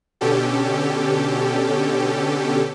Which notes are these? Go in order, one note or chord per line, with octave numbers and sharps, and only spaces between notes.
B2 D3 C#4 G4 A4